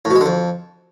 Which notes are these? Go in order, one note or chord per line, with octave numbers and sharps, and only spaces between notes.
A2
B2
G#3
D3
F2